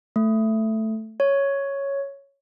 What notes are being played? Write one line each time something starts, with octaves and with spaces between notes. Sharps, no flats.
A3
C#5